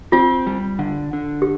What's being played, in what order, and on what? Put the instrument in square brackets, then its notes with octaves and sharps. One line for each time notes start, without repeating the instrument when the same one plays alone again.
[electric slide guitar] C4 [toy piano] F4
[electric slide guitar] G3
D3
D3
[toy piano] G4